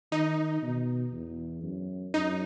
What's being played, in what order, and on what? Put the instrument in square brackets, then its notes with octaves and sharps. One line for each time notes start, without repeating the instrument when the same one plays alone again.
[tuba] D#3 [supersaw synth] D#4
[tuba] B2
E2
F#2
[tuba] F#2 [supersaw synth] D#4